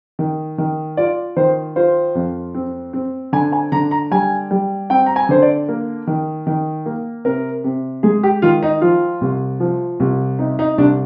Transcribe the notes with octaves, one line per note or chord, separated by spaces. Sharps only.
D#3
D#3
F4 D5
D#3 C5
F4 C5
F2
C4
C4
D3 G#5
G#5
D3 A#5
A#5
G3 G#5
G3
C4 G5
A#5
G#5
D3 C5
D5
A#3
D#3
D#3
A#3
C3 A#4
C3
G#3 G#4
G4
D#3 F4
D#4
F3 F4
C2
F3
C2
C3 D#4
D#4
C2 D4